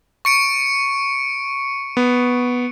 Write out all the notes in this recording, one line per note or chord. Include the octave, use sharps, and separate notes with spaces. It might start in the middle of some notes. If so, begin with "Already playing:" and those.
C#6 C#7 D7
B3